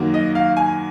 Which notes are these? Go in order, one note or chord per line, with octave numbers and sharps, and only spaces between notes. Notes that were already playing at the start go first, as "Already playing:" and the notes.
Already playing: F#2 D#3 F#3 A#3
D#5
F5
G#5